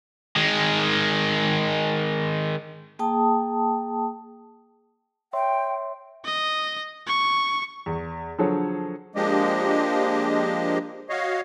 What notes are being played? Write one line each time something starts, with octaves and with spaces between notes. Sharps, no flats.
D#3 G#3
A#3 G#4 G5 A5 D#6
C#5 E5 G5 C6
D#5
C#6
E2
D3 F3 F#3 G#4 A4 C#5
F3 G#3 A#3 D4 G4 D#5
F#4 C#5 D#5 F5